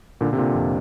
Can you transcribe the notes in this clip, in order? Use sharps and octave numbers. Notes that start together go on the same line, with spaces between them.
A#2 D3
C3
A#2 D3
F2